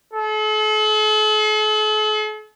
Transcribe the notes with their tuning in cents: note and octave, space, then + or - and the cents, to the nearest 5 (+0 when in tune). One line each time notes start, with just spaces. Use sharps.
A4 -45